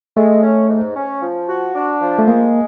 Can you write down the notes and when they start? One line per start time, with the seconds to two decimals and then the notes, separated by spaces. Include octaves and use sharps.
0.17 G#3 A3
0.43 C#4
0.69 G#2
0.96 C#4
1.22 F3
1.48 F#4
1.75 D4
2.01 F3
2.19 A3
2.28 G#3 A#3